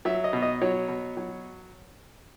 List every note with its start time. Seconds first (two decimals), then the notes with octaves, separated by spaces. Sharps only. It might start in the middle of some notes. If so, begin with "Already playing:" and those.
0.05 F#3 E5
0.24 D#5
0.33 B2
0.42 D#5
0.62 F#3 C#5
0.88 B2
1.17 F#3